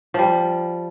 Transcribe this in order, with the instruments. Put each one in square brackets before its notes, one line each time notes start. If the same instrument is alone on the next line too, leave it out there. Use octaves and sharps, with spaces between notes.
[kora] F3 G3